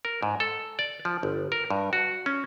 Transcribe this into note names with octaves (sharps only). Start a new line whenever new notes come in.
A#4
G#2
A4
D5
F3
G1
A#4
G2
F#4
C#4